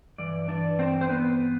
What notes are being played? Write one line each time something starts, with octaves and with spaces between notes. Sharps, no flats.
G2 E3 D5
D4 D5
C4 C5
C5
B3 B4